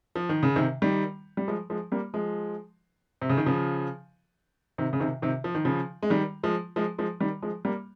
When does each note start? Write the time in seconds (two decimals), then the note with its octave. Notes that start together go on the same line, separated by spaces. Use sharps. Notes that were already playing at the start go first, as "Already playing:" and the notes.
0.16 F3
0.29 D#3
0.43 C#3
0.56 C3 D#3
0.82 D#3 G3
1.37 G3
1.48 F3 G#3
1.70 F3 G#3
1.92 G3 A#3
2.14 F3 G#3
3.22 C3
3.30 C#3
3.37 D#3
3.46 C#3 F3
4.78 C3 D#3
4.93 C#3
5.00 C3 D#3
5.22 C3 D#3
5.44 F3
5.55 D#3
5.65 C#3 F3
6.03 G#3
6.10 D#3 G3
6.43 F3 G#3
6.76 F3 G#3
6.98 F3 G#3
7.20 D#3 G3
7.42 F3 G#3
7.65 G3 A#3